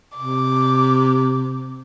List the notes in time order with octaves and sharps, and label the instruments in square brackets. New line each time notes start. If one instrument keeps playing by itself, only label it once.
[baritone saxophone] C3 [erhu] D6